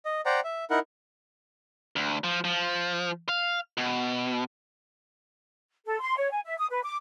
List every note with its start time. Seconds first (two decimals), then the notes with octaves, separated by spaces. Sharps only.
0.05 D#5
0.26 C5 D5 F#5 G5 A#5
0.44 E5
0.70 D#4 E4 A#4 F#5
1.96 D2
2.24 F3
2.44 F3
3.29 F5
3.77 B2
5.86 A4
6.00 C6
6.17 C#5
6.31 G#5
6.45 E5
6.58 D#6
6.70 B4
6.83 D6